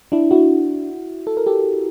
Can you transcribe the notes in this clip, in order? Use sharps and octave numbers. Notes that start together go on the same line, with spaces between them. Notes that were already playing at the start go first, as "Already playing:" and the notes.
D4 E4
E4 F#4
A4
A#4
G4 A4